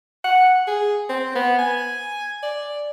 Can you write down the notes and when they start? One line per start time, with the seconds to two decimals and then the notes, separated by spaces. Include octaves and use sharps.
0.24 F#5
0.67 G#4
1.09 C4
1.35 B3
1.59 G#5
2.42 D5